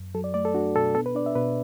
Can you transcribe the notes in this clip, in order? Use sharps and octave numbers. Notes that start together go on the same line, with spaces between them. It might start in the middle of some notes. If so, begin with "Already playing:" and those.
Already playing: F#2
F#3 A4
D5
A3 D5
A4
D4 F#4
B2 A4
B3 A4
B4
D4 D5
E5
B2 B4